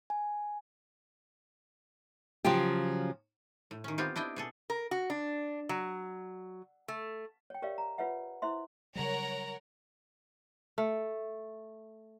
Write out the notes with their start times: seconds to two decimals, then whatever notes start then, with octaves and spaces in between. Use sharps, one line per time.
0.10 G#5
2.45 C#3 F3 F#3 F4 G4
3.71 A2
3.84 D#3 C#4
3.98 B3 C4 F4 G4
4.16 D4 E4 D#5 G5
4.36 B2 G#4 A4
4.70 A#4
4.91 F#4
5.10 D4
5.69 F#3
6.88 A3
7.50 C#5 G5
7.62 G4 A#4 C#5 D5 E5 F5
7.78 A#5
7.98 F4 B4 C#5 E5 F#5
8.42 E4 C5 E5 C6
8.95 C#3 F#3 G3 A#4 C#5 F#5 A#5
10.78 A3